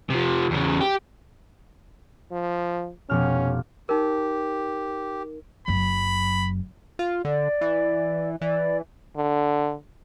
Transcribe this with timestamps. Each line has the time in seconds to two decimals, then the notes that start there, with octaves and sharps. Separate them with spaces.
0.10 C3 F3
0.51 E2 C#3
0.81 G4
2.32 F3
3.09 F1 B2 C#4 F6
3.89 D#4 G4 A#4
5.68 F#1 F#2 B5
6.99 F4
7.25 D3 D5
7.61 E3
8.41 E3 D5
9.16 D3